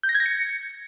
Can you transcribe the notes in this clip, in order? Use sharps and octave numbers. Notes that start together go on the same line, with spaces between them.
G6
A#6
G#6
A#6
C#7